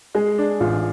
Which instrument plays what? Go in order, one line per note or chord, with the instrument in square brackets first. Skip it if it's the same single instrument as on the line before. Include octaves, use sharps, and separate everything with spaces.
[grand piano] G#3 [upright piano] G#4
[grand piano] D4
[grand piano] A1 [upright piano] F4